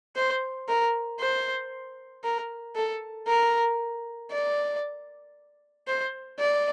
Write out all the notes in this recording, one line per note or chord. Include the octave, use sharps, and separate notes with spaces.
C5
A#4
C5
A#4
A4
A#4
D5
C5
D5